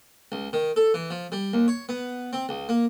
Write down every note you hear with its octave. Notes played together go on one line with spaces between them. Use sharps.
C#2
D#3
A4
E3
F3
G3
D#2
C#5
B3
C4
C#2
A#3